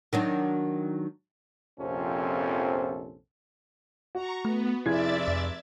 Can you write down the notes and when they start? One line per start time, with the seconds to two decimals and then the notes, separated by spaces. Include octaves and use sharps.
0.13 D#3 F#3 D4
1.79 A#1 F2 C3 C#4 A4 C5
4.15 F#4 A#5 C#6
4.45 A3 B3
4.86 F1 E4 G#4 D5 E5 G#6 A6
5.28 F2